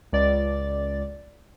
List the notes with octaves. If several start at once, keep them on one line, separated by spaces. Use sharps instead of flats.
C#2 D5 A6